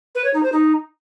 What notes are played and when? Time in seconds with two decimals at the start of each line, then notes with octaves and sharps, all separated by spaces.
0.15 B4
0.24 C#5
0.34 D#4
0.43 C5
0.52 D#4